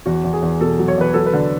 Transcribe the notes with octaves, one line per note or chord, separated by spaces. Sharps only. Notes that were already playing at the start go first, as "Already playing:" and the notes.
E2 F#4
E2
G#4
E2
B2 A4
F#3
C#5
E2 B4
F#3 A4
B4
D3